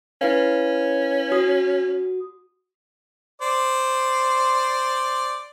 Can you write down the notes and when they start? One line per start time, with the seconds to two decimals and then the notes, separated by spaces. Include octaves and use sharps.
0.21 C#4 E4 B4 F5
1.32 F#4 D#6
3.42 C5 D5